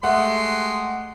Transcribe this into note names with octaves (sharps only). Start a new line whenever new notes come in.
G#3 A3 G4 F#5 C6